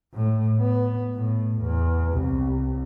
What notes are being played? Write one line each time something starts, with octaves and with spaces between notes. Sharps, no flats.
A2
B3
A2
E2
C2